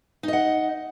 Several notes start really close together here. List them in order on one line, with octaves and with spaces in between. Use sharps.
D#4 D#5 F#5